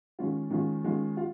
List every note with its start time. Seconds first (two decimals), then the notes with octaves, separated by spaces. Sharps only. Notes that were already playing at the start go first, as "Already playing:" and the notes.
0.19 D#3 G#3 C#4 F4
0.50 D#3 G#3 C#4 F4
0.84 D#3 G#3 C#4 F4
1.17 F4